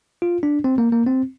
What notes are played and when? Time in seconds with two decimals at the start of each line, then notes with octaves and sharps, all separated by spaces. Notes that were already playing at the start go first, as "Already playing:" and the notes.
0.22 F4
0.43 D4
0.64 C4
0.78 A#3
0.92 A#3
1.06 C4